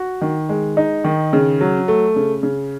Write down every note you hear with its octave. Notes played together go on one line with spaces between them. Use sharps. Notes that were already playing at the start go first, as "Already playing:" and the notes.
Already playing: F#4
D#3
G#3
D#4
D#3
C#3
F#3
A3
C#3
C#3